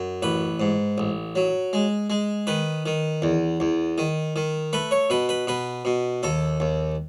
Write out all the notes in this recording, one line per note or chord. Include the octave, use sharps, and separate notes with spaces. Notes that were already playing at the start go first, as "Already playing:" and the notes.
Already playing: F#2
A1 B4
G#2
A1
F#3
G#3
G#3
D#3 B4
D#3
E2
E2
D#3
D#3
A3 B4
C#5
B2 B4
B4
B2 B4
B2
D#2 A4
D#2